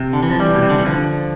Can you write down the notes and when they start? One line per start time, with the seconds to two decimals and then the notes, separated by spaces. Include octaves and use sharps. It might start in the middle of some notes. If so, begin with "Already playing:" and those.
Already playing: C3
0.13 D3
0.23 E3
0.31 F3
0.39 E3 G3
0.55 B2
0.62 C3
0.69 D3
0.78 E3
0.85 D3 F3